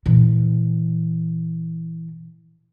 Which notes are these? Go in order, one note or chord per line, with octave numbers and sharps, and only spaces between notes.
A#2 E3